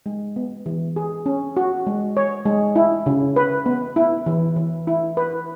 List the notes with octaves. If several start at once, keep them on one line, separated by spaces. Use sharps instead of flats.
G#3
B3
E3
G#4
C#4
F#4
G#3
C#5
G#3
E4
C#3
B4
B3
E4
E3
E3
E4
B4